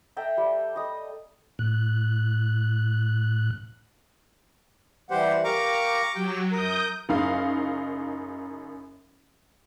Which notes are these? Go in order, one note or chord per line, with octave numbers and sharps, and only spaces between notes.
A4 E5 G5 A#5
G3
D#5 D#6
A2 F#6
E3 G3 G4 C5 F#5
G4 A#4 F5 A#5 C#6 D6
F#3 G4 G5
F#2 A#4 D#6 G6
F#1 F#2 D#4 F5